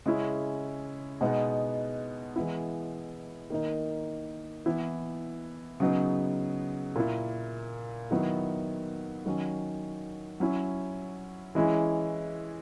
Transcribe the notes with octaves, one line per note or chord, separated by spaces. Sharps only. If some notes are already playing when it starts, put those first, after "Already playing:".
C#3 G#3 C#4 E4
B2 G#3 B3 D#4
E3 G#3 B3 E4
D#3 A#3 D#4
E3 B3 E4
C#3 F#3 B3 D#4
A#2 A#3 E4
D#3 F#3 B3 E4
D#3 F#3 C#4
F#3 C#4 E4
E3 G#3 C#4 E4